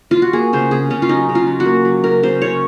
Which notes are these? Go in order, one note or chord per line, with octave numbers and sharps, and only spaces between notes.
F4
F#4
A#3 G#4
C#3 C5
C#3 G#4
C#3 C#4
F4
F#3 D#4
C#3
F4
F#3
F#4
A#3
F#3
C#3 A#4
C#3 C5
C#3 C#5